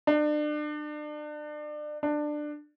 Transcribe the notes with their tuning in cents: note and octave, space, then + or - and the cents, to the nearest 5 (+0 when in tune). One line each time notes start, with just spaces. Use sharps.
D4 +35
D4 +20